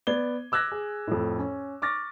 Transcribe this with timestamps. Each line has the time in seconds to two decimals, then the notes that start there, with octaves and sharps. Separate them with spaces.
0.07 B3 D5 G#6 G7
0.52 D6 E6 F#6 G#6 A#6
0.72 G#4
1.08 F2 A2
1.38 C#4
1.82 C#6 D6 F6 A6 A#6